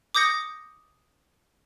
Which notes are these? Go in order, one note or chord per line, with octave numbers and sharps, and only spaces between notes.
D6 D#6 G6 A#6 C#7